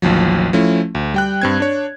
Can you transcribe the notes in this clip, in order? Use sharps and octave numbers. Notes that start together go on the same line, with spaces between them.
A1 D#2 F3 F#3
F3 A3 C#4 E4
D2
G3 G5 F#6
G2 C4 G#6
D4 C#5